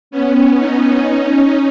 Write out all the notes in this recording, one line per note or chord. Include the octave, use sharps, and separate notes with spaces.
B3 C#4
C#4 D#4
C#4 D#4